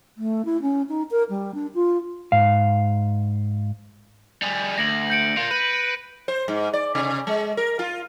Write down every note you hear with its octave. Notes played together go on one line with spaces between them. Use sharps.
A3
E4
C#4
D#4
A#4
G3
D4
F4
G#2 F5
G3 G#4
D2 A#6 F#7
G6 C#7 D7
A#3 F4
B4 D#7
C5
G#2
D5
C3
G#3
A#4
F4